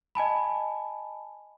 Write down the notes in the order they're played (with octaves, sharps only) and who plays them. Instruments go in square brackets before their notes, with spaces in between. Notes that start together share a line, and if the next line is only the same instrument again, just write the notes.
[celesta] D#5 G#5 A5 B5